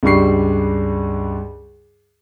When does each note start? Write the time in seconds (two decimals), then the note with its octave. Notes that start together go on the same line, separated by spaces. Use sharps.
0.03 C#2 G2 G3 C#6 C7